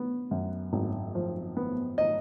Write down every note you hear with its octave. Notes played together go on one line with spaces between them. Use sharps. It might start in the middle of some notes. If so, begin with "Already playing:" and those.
Already playing: B3
F#2
G#1
F3
B3
D#5